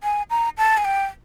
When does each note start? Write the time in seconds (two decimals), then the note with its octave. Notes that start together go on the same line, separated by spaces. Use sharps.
0.03 G#5
0.30 A#5
0.58 A5
0.77 G#5
0.85 G5